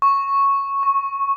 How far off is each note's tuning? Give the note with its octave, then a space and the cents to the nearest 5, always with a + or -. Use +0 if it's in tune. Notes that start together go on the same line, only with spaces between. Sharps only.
C#6 -5
C#6 -25